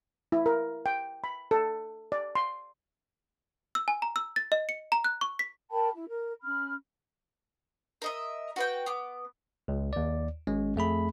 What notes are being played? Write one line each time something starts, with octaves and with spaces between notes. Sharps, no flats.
E4
A#4
G5
B5
A4
D5
C6
E6
G#5
A#5
E6
A6
D#5
C#7
A#5
F#6
C#6
B6
A#4 G5 A5 B5
E4
A#4
C#4 B5 F6
A#4 D#5 E5
F#4 B4 G5
B3 D6
C#2
D#2 D5
G#1 G#3 C#4
F2 A3 G#4 B5